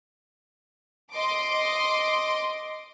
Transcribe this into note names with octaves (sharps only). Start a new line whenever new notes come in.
D#5 C6 D6